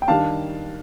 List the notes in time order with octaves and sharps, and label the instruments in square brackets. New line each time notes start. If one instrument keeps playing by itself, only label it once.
[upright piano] G5
D#3 G3 D4 F5 A5